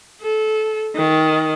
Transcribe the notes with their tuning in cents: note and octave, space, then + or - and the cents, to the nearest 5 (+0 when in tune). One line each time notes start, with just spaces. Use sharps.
A4 -20
D#3 +15